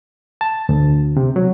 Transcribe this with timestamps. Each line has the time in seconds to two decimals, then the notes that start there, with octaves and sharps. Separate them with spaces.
0.41 A5
0.69 D2
1.17 C3
1.36 F#3